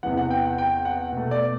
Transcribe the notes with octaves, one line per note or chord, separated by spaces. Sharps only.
E2 C3 E3 F#5
F#5
G5
F#5
G5
F#5
B2 A3
D5